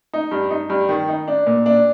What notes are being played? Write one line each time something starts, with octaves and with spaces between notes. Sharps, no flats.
D#4
G2
D#4
G2
D#3
D#4
D4
A#2
D4